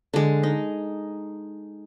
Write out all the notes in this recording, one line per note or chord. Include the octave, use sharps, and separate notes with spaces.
D3 G#3
D#4